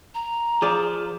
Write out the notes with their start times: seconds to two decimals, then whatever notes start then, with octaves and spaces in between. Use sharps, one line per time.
0.14 A#5
0.62 F3 G#4 D5